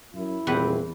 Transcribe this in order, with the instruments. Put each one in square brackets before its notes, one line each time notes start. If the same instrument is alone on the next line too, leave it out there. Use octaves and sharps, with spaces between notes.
[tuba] F#2 [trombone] E4
[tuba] D#1 [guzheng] E2 B4 F#5 [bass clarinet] C4